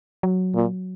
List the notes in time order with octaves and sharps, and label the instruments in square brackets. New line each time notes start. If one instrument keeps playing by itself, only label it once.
[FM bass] F#3
[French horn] A#2